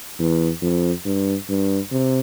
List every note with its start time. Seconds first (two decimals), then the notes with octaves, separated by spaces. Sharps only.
0.20 E2
0.62 F2
1.06 G2
1.49 G2
1.92 C3